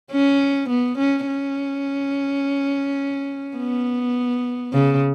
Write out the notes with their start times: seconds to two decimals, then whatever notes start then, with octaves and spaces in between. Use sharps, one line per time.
0.12 C#4
0.69 B3
0.98 C#4
1.27 C#4
3.57 B3
4.73 C#3